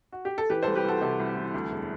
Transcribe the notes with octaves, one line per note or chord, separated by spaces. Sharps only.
F#4
G4
A4
E3 G4 B4
C2 A4 C5
G4 B4
C2 F#4 A4
C3 F#4 A4
C2
E3
D2
E1